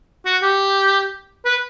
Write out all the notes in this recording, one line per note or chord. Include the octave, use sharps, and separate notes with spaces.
F#4
G4
B4